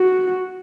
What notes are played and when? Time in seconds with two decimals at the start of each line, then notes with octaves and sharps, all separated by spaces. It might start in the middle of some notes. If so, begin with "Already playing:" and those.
Already playing: F#4